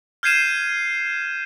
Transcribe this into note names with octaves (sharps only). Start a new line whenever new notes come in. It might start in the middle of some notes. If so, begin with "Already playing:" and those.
F6 G6 G#6 C7 D#7 E7